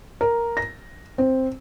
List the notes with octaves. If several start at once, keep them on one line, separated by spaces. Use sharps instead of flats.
A#4
A#6
C4